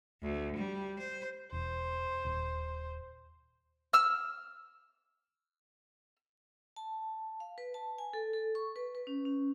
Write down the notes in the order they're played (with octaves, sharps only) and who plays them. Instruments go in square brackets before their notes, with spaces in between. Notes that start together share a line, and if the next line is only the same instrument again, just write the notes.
[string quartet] D2
G3
C5
[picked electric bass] E1 [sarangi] C5
[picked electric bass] D#1
[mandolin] E6 F6
[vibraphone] A5
F5
B4
A5
G#5
A4
A4
C#6
B4
B4
C#4
C#4